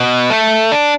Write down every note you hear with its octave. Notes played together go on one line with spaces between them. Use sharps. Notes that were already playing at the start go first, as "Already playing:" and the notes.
Already playing: B2
A3
D4